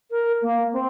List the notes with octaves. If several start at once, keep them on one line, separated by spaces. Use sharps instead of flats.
A#4
A#3
C4